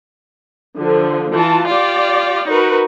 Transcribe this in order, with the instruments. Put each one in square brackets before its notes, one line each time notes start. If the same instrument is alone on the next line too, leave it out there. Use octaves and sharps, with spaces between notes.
[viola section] D3 F3
[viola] E3 [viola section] F4 A5
[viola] F4 G4 [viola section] D5
[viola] D#4 F#4 [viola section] A#4 B4